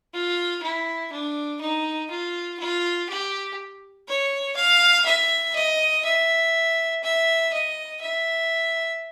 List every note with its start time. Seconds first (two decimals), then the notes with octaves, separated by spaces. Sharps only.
0.14 F4
0.63 E4
1.12 D4
1.61 D#4
2.11 F4
2.60 F4
3.10 G4
4.08 C#5
4.56 F5
5.06 E5
5.56 D#5
6.05 E5
7.04 E5
7.53 D#5
8.02 E5